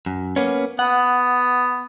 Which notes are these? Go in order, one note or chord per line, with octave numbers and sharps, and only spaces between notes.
F#2
A#3 B3 C#4
B3 F#5